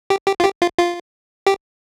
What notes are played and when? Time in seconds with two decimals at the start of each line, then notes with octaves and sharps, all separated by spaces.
0.10 G4
0.27 G4
0.40 F4
0.44 G4
0.62 F4
0.78 F4
1.47 G4